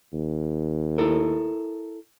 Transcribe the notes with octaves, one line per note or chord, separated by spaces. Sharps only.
D#2
E4 A4 A#4